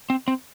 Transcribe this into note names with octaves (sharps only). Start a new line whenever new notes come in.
C4
C4